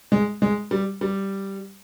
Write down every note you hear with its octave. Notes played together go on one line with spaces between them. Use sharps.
G#3
G#3
G3
G3